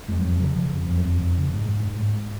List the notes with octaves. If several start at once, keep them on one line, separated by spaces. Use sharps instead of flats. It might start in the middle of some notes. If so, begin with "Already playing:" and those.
F2 G#3
F#3
F2 F3
C#3 F#3
C#3 F3
F2
F2
F#3
F2 F3
F2
C#3
G#2
G#2
G#2
G#2